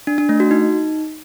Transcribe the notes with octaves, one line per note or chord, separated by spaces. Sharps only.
D4
D4
A3
F#4
D#4